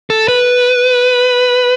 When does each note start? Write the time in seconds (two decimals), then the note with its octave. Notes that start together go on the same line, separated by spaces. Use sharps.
0.10 A4
0.28 B4